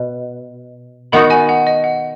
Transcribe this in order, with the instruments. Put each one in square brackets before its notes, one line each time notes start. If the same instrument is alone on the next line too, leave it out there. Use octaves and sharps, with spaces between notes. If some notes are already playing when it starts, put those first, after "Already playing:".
Already playing: [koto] B2
[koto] D#3 B3 D#4 F#4 [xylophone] F#5 B5
[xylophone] D#5 G#5
F#5
D#5
F#5